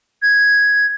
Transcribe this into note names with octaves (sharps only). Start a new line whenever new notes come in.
G#6